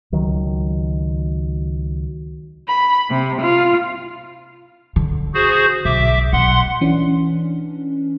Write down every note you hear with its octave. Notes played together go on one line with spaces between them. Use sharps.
C#2 D#3 F#3
B5
C3
F4
D3
F#4 G#4 C5
B1 E5 D6
B1 F#5 C6
E3 C#4 D4